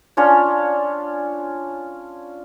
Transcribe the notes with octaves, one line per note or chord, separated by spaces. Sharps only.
C#4 D4 F4 C#5